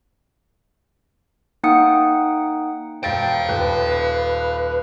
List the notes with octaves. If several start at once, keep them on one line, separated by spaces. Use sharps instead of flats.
A#3 D#4 F#5 G5 D#6 C#7
E1 C5 F5 G5 A6 D7
D#1 B4